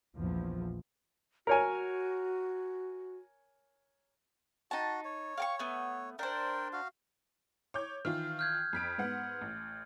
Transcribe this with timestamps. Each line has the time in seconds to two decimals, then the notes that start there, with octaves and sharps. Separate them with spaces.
0.17 A#1 E2 F3
1.47 F#4 A#4 C#5 G#5
4.71 D#4 F#4 A5
5.05 C#5
5.38 F5 G5 C#6
5.59 A3 B3
6.19 D4 A#4 C5 G5
6.73 F#4 F5
7.74 C#5 D6 G6
8.05 D#3 E3 F4 F6
8.39 F6 G6 G#6
8.73 F2 B6 D7
8.98 G#2 B3 F#5
9.41 A1